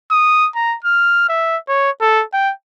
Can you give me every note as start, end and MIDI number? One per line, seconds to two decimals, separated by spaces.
0.11 0.48 87
0.55 0.77 82
0.85 1.27 89
1.29 1.57 76
1.68 1.90 73
2.01 2.24 69
2.33 2.52 79